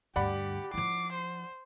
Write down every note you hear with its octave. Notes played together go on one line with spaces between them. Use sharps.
D2 G2 G4 D5 F#5 B5
F3 E4 D6 C7
C5